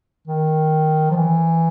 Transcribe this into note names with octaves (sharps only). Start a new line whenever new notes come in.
D#3
F3
E3